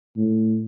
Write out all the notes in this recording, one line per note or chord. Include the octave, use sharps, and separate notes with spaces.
A2